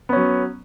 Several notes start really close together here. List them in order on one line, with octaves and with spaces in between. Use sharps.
B3 C#4 F#3